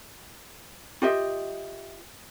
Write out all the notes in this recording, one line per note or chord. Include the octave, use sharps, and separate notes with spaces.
F4 G4 D#5 E5